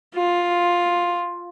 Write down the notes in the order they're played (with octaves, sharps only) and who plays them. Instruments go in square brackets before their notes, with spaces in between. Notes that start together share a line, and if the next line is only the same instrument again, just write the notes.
[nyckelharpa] F4